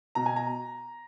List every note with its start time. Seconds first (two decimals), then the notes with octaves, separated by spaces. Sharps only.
0.15 B2 A#5
0.26 G#5
0.36 A#5